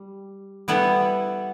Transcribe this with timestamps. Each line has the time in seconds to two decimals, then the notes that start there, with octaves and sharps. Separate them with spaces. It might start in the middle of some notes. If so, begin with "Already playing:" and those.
Already playing: G3
0.68 G3 B3 E4 A4